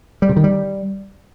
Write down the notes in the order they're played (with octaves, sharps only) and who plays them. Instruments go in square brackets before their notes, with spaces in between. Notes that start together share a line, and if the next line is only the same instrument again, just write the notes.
[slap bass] G3
C3
D#3
G3